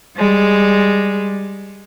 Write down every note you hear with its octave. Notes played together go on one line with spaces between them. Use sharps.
G3 G#3